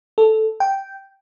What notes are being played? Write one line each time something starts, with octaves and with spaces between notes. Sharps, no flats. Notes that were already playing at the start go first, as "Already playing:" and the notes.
A4
G5